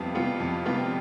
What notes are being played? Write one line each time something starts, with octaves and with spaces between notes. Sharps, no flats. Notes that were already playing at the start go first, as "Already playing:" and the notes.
Already playing: F2 C3 G3 B3 F4
C3 G3 B3 F4
F2
C3 G3 B3 F4